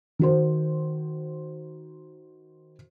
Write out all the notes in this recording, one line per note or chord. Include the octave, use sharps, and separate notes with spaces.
D#3 F#4 C5